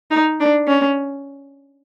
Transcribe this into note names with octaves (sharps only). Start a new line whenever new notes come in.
D#4
D4
C#4